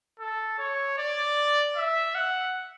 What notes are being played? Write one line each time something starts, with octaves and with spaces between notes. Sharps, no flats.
A4
C#5
D5
E5
F#5